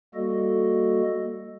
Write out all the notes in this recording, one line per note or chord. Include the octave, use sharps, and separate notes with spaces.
G3 A#3 F#4 A4 D#5